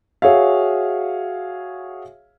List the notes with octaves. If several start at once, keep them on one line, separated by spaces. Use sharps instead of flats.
F#4 G#4 C#5 E5 F5